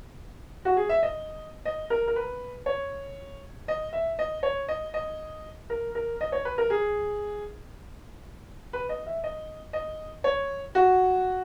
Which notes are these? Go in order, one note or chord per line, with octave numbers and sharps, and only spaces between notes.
F#4
G#4
E5
D#5
D#5
A#4
A#4
B4
C#5
D#5
E5
D#5
C#5
D#5
D#5
A#4
A#4
D#5
C#5
B4
A#4
G#4
B4
D#5
E5
D#5
D#5
C#5
F#4